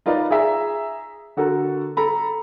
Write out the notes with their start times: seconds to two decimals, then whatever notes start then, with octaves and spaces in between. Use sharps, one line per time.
0.06 D#4 F4 A#4 B4 D5 D#5
0.31 G#4 E5 A#5
1.37 D3 F#4 A4 A#4
1.97 A4 A#5 B5